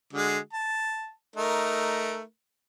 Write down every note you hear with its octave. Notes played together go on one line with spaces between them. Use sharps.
D3 G#3 F#4
A5
A3 D#4 A#4